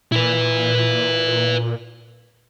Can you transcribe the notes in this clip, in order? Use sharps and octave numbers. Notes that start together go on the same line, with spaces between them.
A#2 E4 B4